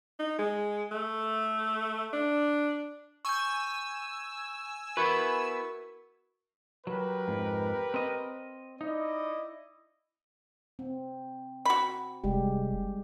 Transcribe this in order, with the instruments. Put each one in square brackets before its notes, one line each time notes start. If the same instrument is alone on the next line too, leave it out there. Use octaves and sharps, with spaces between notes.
[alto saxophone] D#4
G#3
A3
D4
[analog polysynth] G#5 E6 [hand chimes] C#6 G6
[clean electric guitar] B3 E4 B4 [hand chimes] F#4 A#4 C#6
[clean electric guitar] F#3 [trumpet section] G4 A#4 B4
[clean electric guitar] F2 G#2
C4 D#5
[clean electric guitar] D#4 [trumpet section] E4 D5 D#5
[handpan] C4
[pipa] F#4 B5
[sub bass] F1 [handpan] G3 G#3 G4